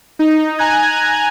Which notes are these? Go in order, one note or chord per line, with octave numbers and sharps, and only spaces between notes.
D#4
G#5 A#5 F#6 G#6